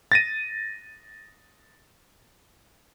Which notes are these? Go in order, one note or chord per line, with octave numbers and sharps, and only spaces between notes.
A6 A#6 D#7